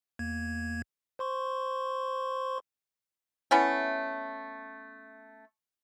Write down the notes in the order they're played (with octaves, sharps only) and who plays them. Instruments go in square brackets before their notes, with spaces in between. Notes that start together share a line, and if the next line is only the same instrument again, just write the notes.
[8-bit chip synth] E2 A#3 G#6
C5 C6 C#6
[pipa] A3 B3 C#4 E4